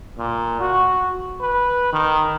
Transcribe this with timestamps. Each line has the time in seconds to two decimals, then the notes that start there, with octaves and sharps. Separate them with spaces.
0.18 A#2
0.61 F#4
1.41 B4
1.93 D#3